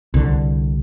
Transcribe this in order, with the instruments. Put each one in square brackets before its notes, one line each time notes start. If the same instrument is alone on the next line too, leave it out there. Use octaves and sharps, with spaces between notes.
[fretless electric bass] C2 D3